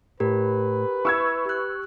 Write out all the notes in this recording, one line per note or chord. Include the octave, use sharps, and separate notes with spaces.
A2 G4 A#4 B4
E4 C#6 E6 G#6
G4 F#6